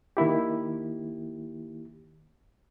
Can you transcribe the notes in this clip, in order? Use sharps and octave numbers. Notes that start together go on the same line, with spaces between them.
D#3 A#3 E4 G4